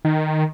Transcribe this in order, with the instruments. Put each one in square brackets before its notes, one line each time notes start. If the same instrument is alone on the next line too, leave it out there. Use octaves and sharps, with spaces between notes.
[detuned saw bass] D#3